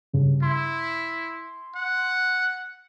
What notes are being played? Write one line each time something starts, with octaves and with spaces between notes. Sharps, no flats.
G2 C#3
E4 C6
F#5